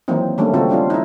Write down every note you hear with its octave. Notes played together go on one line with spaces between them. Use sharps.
D#3 E3 F#3 A#3 C4 D#4
D#3 G3 A3 A#3 C#4 D4
C#3 C4 D#4 F4 F#4 A4
G3 C#4 D4 F4
D#4 E4